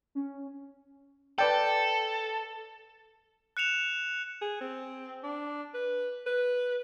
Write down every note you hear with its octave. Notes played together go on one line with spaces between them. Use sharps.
C#4
A4 B4 D5 G5
F#6 C#7 E7 F7
G#4
C4
D4
B4
B4